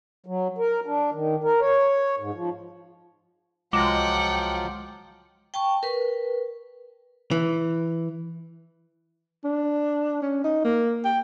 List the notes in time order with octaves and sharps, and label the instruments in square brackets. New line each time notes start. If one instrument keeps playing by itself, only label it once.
[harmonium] F#3
A#4
D4
D#3
A#4
C#5
G#2
F3
[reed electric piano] C2 D6 [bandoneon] F3 F#3 F4 [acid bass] G#3 [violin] F#5 G5
[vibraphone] G5 A5 C#6
A#4 B4
[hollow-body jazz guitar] E3
[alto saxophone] D4
C#4
D#4
A#3
G5